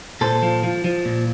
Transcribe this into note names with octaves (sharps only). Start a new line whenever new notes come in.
A#2 A4 C5
F3
F3
F3
A#2